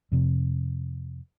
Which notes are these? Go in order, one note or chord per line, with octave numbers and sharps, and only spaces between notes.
F2 C3